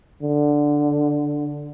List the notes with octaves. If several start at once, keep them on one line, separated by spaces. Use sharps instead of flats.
D3